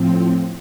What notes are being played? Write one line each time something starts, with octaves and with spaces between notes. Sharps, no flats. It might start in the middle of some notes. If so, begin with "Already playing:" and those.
Already playing: A2 F3 C4